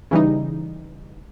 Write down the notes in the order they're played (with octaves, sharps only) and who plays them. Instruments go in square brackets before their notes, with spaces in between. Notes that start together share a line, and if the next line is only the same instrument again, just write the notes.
[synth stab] C#3 E3 G3 D#4